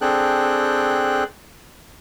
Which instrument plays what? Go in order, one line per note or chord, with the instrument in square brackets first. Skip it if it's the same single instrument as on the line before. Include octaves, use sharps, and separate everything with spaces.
[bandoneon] C4 D4 G#4 A4 G5 F#6